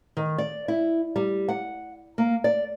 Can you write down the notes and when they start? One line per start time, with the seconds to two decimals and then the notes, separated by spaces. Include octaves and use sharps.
0.17 D#3
0.38 D5
0.68 E4
1.16 G3
1.49 F#5
2.18 A#3
2.44 D5